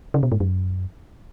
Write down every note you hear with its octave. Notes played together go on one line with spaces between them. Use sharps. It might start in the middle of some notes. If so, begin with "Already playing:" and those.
C#3
B2
G#2
F#2